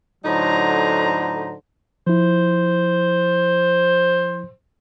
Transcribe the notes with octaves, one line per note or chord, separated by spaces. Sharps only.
A2 D3 F#3 D#4 C5 A#5
F3 E4 C5